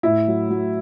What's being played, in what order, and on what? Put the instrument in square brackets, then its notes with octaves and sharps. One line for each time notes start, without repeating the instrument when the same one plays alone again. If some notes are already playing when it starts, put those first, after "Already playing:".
[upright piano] A2 E4
F#3
F#3